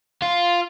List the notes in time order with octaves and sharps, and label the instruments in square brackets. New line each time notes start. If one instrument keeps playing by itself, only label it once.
[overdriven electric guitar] F4